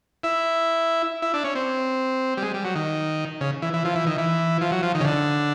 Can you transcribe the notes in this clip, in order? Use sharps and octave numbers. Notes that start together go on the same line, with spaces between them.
E4
E4
D4
C#4
C4
G3
G#3
G3
F#3
D#3
C#3
E3
E3
F3
E3
D#3
E3
F3
F#3
F3
D#3
C#3
D3